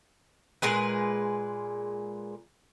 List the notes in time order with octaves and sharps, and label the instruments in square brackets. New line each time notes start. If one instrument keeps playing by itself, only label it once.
[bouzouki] A#2 G#3 G#4 B4